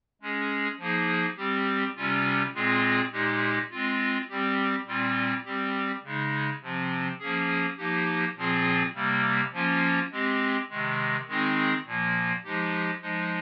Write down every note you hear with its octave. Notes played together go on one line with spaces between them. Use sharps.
G#3 C#4 G#4
F3 A#3 D#4 G#4
G3 C4 G4
C3 G3 C#4 F4
A#2 G#3 C4 F4 G#4
A#2 G#3 D#4 G4
G#3 C4 F4
G3 C4 G4
A#2 G3 C4 F4
G3 C4 G4
C#3 G#3 D#4
C3 F3 C4
F3 A#3 C#4 G#4
F3 A#3 D#4 G4
A#2 F3 C4 F4 G#4
C3 G3 A#3
F3 A#3 C#4 F4
G#3 C4 G4
C3 D#3 G#3
D#3 G#3 C4 D#4 G#4
A#2 F3 A#3
F3 G#3 D#4 G4
F3 G#3 D#4